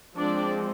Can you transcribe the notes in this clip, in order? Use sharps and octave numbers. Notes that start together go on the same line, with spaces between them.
F3 G#3 C4 D4 D5